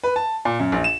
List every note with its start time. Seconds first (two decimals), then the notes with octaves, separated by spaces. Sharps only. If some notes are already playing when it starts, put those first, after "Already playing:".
0.03 B4
0.16 A5
0.45 A#2
0.60 F#2
0.72 A#1
0.84 E7